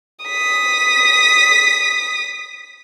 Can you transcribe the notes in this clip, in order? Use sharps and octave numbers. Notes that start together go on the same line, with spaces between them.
D#6 B6